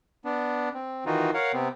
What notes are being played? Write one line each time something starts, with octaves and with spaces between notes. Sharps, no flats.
B3 D4
C4
D#3 E3 D#4 F4 F#4
A#4 C#5 F5 F#5
C3 B3 C4